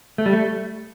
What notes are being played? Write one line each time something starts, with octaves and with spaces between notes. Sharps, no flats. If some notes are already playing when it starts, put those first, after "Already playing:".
A3
G3
A3